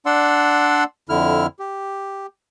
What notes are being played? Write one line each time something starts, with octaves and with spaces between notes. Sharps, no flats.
D4 D5 F#5 C6 E6
F2 D3 E4 F6
G4